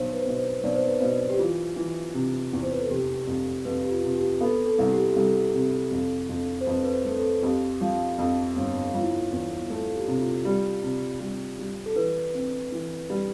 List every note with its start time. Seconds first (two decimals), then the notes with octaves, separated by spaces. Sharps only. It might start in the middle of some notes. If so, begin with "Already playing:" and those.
Already playing: B1 C5
0.13 B4
0.20 C5
0.26 B2 B4
0.38 C5
0.64 B1 D5
0.75 C5
0.87 B4
0.99 B2 C5
1.30 G4
1.39 E3 F4
1.76 E3
2.14 C3
2.53 E2
2.63 C5
2.71 B4
2.80 A4
2.90 F1 G4
3.27 F2
3.65 F2 B4
3.83 G4
3.90 F4
4.03 C3 F4
4.15 G4
4.41 B3 A4
4.66 A4
4.79 C2
4.92 G4
5.12 G4
5.16 C2 A4
5.54 C3
5.91 F2
6.29 F2
6.61 C5
6.67 F2 B4
6.84 B4
6.93 C5
7.05 A3
7.18 A4
7.43 F2 G4
7.81 F3
8.19 F2
8.56 G1
8.94 F3 F4
9.02 E4
9.10 F4
9.32 E2
9.70 A3 A4
9.95 G4
10.08 C3
10.20 F4
10.45 G3
10.82 C3
11.20 G3
11.59 G3
11.86 A4
11.96 E3 B4
12.34 C4
12.72 E3
13.10 G3